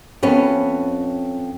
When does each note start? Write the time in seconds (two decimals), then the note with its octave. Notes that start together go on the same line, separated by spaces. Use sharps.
0.23 F2 B3 C#4